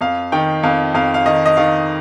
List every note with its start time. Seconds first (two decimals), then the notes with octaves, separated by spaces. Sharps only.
0.01 F2 F5
0.32 D#3 G5
0.63 F2 F5
0.94 F2 F5
1.14 F5
1.26 D#3 D#5
1.46 D#5
1.57 D#3 F5